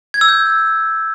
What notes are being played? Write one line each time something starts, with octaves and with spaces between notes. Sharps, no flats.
G#6
E6
G6